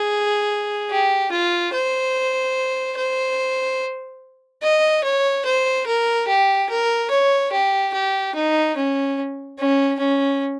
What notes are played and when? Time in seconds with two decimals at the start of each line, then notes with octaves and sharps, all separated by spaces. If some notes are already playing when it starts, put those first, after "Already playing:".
Already playing: G#4
0.90 G4
1.31 F4
1.73 C5
2.97 C5
4.63 D#5
5.04 C#5
5.45 C5
5.86 A#4
6.28 G4
6.69 A#4
7.10 C#5
7.52 G4
7.94 G4
8.35 D#4
8.76 C#4
9.59 C#4
9.99 C#4